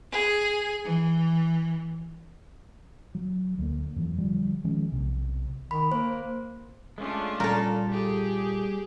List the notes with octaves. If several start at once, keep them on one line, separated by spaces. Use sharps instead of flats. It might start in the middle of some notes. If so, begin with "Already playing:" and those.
G#4
E3
F#3
D2 A#3
F2 E3 F#3
D3 F3 G3
D#3 F3 G#3 C#4
B1 C3
D#3 B5
A#3 C5
G#3 A3 C#4 D4 F4
A#2 G3 A4 A#4 A#5
G4 G#4